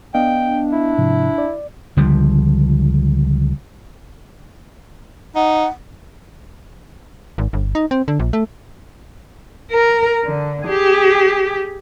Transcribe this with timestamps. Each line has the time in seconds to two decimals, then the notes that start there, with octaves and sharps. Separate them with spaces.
0.14 B3 D4 D#5 F5 G5
0.72 E4
0.98 G#2 C3 F3
1.38 D5
1.97 C#2 D3 F3 G3
5.36 D#4 F#5
7.38 G#1
7.53 G1
7.75 D#4
7.91 C4
8.08 D3
8.19 A#1
8.33 A3
9.71 A#4
10.25 D3
10.65 G4 G#4